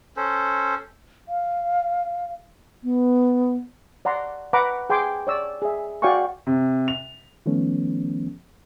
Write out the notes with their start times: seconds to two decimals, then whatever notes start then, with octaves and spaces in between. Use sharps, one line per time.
0.17 C#4 A4 C5
1.28 F5
2.83 B3
4.05 D5 F#5 A#5 C6
4.53 B4 F#5 A#5 B5 D6
4.90 G#4 G5 G#5 C6 D6
5.27 C#5 D5 E6
5.62 G#4 E5
6.02 F#4 D5 F5 G5 G#5 C#6
6.47 C3
6.88 F7
7.46 D#3 F3 A3 B3 C#4